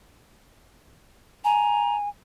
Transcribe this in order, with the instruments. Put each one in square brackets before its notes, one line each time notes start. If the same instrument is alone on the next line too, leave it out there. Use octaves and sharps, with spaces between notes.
[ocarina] G#5 [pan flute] A#5